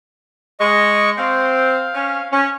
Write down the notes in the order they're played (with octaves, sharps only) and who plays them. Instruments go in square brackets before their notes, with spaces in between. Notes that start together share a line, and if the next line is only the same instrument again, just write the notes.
[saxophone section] G#3 [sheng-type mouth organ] D#5 C#6
[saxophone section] C4 [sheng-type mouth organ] F5
[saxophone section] C#4
C#4